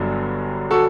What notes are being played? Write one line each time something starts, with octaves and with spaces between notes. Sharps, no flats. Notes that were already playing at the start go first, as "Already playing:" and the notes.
Already playing: G1 G2 D3 F#3
F#4 A4